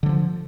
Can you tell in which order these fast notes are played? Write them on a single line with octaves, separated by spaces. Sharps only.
D3 F#3 F3